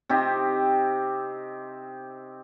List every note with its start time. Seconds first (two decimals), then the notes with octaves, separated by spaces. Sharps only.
0.09 C3 C4 D#4 G4